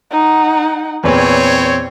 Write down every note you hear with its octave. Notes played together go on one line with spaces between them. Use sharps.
D#4 F#5
E2 A#2 C4 B4 C#5